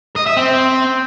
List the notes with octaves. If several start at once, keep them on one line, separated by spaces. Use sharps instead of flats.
D#5
E5
C4